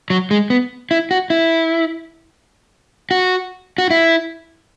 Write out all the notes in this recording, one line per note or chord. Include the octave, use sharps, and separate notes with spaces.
F#3
G#3
B3
E4
F#4
E4
F#4
F#4
E4